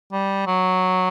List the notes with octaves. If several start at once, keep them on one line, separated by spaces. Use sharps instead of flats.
G3
F#3